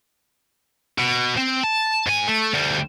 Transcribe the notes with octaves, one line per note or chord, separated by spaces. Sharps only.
B2
C4
A5
G#2 G#5
A3
D2 G3